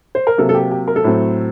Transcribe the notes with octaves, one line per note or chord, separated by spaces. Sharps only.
C5
A#4
C3 F#3 A#3 A4
A4
G4
G4
A#4
A4
A2 F#3 C4